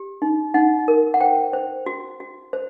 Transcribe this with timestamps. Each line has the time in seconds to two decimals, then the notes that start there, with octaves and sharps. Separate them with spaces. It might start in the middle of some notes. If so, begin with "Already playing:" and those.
Already playing: G4
0.22 D#4
0.54 D#4 F#5
0.88 A#4
1.14 F#5
1.20 C5 G5
1.53 C5
1.86 F#4
2.20 F#4
2.53 C5